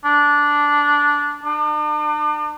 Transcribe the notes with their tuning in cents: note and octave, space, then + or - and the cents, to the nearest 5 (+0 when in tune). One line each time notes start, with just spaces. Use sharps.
D4 -10
D4 +40